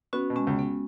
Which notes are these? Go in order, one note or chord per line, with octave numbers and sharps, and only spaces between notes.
B3 C#4 F#4
B2
G#3 C#4
C#2
B3